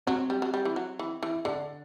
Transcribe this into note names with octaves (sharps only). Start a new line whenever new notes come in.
F#3 C4
G3
F#3
G3
E3
F#3
E3
E3
D3 D4